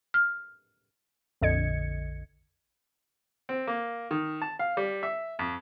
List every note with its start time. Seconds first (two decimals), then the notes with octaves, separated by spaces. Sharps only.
0.14 F6
1.41 A#1 F2 D3 D#5 G#6 C#7
3.49 C4
3.67 A#3
4.11 D#3
4.42 A5
4.59 F5
4.77 G3
5.03 E5
5.39 F2